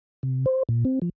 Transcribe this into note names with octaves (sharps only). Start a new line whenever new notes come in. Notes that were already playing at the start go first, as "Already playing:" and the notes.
C3
C5
A#2
C4
F3